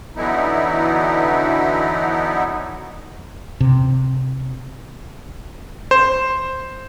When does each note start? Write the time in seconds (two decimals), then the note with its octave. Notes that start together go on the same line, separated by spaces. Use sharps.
0.16 D3 E3 F#3 B3 D#4 E4
3.61 C3
5.91 C5